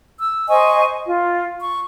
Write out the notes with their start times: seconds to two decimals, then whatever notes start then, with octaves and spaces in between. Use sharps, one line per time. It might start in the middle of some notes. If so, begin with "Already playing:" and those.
0.20 E6
0.49 C5 D#5 G#5 C#6
1.05 F4
1.61 C#6